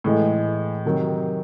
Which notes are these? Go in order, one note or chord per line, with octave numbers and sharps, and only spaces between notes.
A2 E3 G#3
C3 D#3 F#3